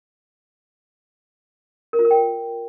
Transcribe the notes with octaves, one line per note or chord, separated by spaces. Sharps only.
A#4
F4
A#4
G5